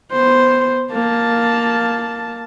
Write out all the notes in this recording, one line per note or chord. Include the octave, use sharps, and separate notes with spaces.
B3 C5
A#3 A5